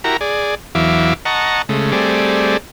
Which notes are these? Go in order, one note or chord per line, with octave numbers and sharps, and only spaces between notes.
E4 F#4 G4 A#4 A#5
G#4 D5
E2 E3 F#3 E5 F5 D6
D#5 F#5 A5 A#5 C#6
C#3 G#3 A3
G3 A3 C4 G#4 D5